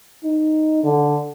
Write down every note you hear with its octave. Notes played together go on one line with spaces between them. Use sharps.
D#4
D3